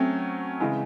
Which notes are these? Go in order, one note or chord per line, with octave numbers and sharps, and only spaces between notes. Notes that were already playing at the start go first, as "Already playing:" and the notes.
Already playing: F#3 A3 C4 C#4
C#3 E3 G#3